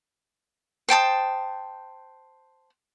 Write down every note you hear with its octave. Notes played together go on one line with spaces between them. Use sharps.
C5 G5 A5 D#6